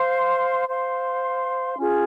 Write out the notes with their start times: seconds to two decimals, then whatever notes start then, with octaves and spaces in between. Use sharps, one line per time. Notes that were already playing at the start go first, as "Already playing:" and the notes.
Already playing: C5 F5 C6
0.68 C5 F5 C6
1.77 C#4 F4 G#4